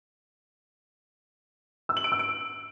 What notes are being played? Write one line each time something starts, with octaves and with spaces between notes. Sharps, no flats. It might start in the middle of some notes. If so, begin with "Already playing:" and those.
E6
F#7
D7
E6
D7